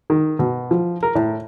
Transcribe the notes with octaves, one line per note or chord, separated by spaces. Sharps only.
D#3
B2
F3
A#4
A2